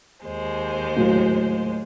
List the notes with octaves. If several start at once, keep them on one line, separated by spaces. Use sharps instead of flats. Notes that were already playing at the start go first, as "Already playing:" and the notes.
D#2 G#3 C5
A2 F#3 A#3